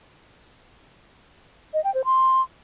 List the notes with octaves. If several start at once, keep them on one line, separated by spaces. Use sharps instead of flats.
D#5
G5
C5
C6